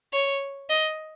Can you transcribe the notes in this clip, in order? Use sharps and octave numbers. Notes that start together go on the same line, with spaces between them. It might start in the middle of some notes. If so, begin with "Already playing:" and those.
C#5
D#5